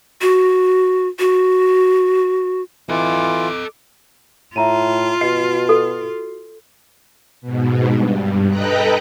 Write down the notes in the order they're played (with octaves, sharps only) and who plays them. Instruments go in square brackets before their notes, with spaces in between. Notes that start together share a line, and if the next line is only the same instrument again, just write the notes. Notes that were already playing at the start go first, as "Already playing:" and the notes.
[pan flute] F#4
F#4
[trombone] E3 [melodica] F4 [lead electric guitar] A4 D#5 [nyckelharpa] D6
[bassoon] A2 [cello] F4 [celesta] E5 A#5 D#7
[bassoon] B2 [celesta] F#4 C7 [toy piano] D#5
[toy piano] A4
[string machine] G#2 B2
G2
A4 B4 D#5 G5 A#5 F#6